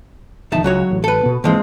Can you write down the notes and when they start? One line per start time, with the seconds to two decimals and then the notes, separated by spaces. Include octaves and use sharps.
0.52 E1 F2 D#3 D#4 E5 A5
0.64 C#2 F#3 F#4 C#5
0.91 A1
1.04 A4 B4
1.23 B2 B3
1.44 G#1 E3 F3 G#3 A#3 C4